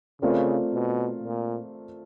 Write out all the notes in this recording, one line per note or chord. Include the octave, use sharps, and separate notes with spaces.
C#3 A3 C4 F4 A#4 D5
B2
A#2